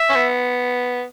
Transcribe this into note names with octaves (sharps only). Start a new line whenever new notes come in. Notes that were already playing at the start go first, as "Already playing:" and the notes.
Already playing: E5
C#4
B3